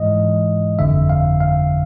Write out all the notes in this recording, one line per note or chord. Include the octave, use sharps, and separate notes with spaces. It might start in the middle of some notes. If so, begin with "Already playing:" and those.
Already playing: G#2 E3 G#3 D#5
G1 F2 D3 E5
F5
F5